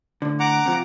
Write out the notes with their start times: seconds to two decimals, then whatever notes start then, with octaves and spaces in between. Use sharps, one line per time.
0.22 A2 D3
0.40 F#5 A#5 D6
0.66 C3 F3